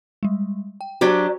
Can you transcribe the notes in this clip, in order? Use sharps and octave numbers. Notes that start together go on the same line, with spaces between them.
G3 G#3
G5
F#3 D4 F#4 G4 C5